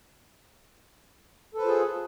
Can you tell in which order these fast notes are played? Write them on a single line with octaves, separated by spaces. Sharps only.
A4 B4 C5 F4 G#4